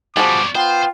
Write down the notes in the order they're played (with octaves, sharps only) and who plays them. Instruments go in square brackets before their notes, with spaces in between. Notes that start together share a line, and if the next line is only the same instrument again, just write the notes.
[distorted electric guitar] B2 G3 [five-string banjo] F3 F#4 G#4 [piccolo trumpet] D6
[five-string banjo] B3 [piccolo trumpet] F4 [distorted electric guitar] C5 [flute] G5